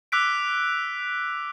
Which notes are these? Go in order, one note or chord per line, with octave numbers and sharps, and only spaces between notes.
D6 E6 F#6 B6 D7